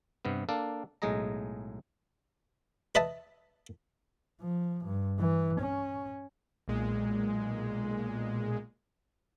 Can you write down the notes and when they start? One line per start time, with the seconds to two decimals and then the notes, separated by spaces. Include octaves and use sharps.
0.25 G2 C3 B3
0.49 A#3 D4 A4 F5
1.02 B1 A2 G#3 G#4 D#5 A#5
2.95 B4 D#5 E5 A5
4.41 F3
4.85 G2
5.19 E3
5.61 C#4
6.68 B1 A#2 G#3